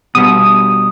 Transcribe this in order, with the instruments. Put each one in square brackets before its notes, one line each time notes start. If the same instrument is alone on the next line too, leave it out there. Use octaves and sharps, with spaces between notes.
[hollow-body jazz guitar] B2 G3 B3 [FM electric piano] D#6